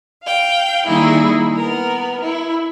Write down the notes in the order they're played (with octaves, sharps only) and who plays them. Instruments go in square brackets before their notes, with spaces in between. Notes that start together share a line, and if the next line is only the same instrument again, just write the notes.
[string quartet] F5 G5
D#3 G3 A#3 D#4 E4 G#4
B3 A#4
E4